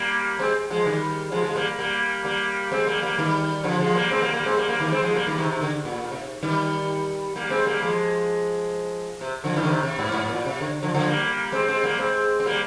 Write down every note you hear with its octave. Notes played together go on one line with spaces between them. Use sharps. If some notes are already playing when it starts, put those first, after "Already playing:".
Already playing: G3 A#3
G#3 C4
F3 G#3
D#3 G3
F3 G#3
F3 G#3
G3 A#3
G3 A#3
G3 A#3
G#3 C4
G3 A#3
G3 A#3
D#3 G3
D3 F3
F3 G#3
G3 A#3
G#3 C4
G3 A#3
G3 A#3
G#3 C4
G3 A#3
G3 A#3
D#3 G3
G#3 C4
F3 G#3
G3 A#3
D#3 G3
C3 D#3
C3 D#3
D3
A#2
A#2
C3
D#3 G3
G3 A#3
G#3 C4
G3 A#3
F3 G#3
C3
D3 F3
D#3 G3
D3
C3 D#3
C3
G#2
G#2
A#2
C3
D3
D3 F3
D3 F3
G3 A#3
G#3 C4
G#3 C4
G3 A#3
G#3 C4
C4
G3 A#3